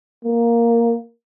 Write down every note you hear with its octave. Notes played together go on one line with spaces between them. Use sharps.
A#3